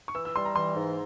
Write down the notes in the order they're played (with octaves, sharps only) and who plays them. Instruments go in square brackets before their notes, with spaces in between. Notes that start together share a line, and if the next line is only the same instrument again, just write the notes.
[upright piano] C#6
[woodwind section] E3 [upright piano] E6
[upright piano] E6
[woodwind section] G3 [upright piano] C6
[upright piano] A#5
[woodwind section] E3 [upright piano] C6
[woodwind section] G#2